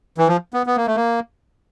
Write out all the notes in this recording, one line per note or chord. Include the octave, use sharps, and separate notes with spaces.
E3
F3
B3
B3
A#3
A3
A#3